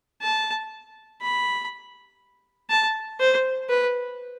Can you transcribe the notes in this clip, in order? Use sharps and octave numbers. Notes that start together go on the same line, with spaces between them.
A5
B5
A5
C5
B4